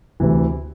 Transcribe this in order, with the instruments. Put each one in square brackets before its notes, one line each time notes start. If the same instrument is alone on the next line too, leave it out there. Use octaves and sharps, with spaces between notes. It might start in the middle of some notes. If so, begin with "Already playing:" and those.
[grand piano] D2 C3 E3